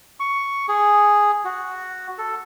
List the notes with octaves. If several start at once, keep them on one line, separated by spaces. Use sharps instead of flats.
C#6
G#4
F#4
A4